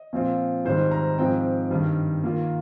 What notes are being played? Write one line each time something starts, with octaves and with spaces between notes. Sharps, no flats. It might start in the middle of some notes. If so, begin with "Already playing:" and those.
Already playing: D#5
A#2 F3 C4 F4
G#2 D#3 G3 C5
A#5
G#2 F3 C4 G5
G2 D#3 G3
D#3 A#3 F4